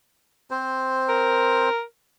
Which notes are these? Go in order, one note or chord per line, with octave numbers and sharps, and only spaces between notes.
C4 C5
A#4